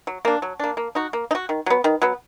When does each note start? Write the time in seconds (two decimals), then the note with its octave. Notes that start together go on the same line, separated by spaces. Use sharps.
0.07 F#3
0.25 A#3 D4
0.42 F#3
0.60 A#3 D4
0.77 A#3
0.95 D#4 F#4
1.13 A#3
1.31 D#4
1.35 F#4
1.49 D#3
1.66 F#3 B3
1.84 D#3
2.02 F#3 B3